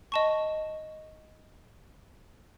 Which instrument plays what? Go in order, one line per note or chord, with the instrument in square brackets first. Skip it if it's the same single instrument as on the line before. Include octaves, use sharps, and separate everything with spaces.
[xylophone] D#5 A5 C#6